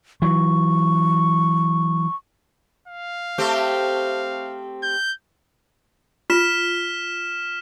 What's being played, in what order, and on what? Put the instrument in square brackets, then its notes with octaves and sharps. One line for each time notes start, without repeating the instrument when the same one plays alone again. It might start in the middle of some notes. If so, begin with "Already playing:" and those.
[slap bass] E3 F#3 [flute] C#6
[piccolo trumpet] F5
[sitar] A3 C4 G4
[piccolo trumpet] G6
[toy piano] F4 [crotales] F6 B6 E7